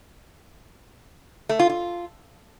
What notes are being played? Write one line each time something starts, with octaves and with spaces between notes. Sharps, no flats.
A3
F4
F4